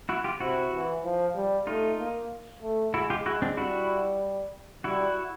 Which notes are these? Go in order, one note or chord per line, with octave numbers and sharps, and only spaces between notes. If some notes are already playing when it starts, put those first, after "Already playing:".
E4 F#4
F4 G4
C3 E4 F#4
E3
F3
G3
A3 D#4 F4
A#3
A3
G#3 E4 F#4
F4 G4
G#3 E4 F#4
C4 D4
G3 E4 F#4
G3 E4 F#4